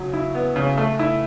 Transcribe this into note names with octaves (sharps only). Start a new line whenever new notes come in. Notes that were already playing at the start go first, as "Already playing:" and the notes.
Already playing: C#3 F#3
E4
B3
C#3
A3
E4